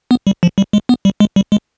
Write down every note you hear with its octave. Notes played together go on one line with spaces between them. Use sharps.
B3
G3
F3
G3
G#3
B3
G3
G#3
G3
G#3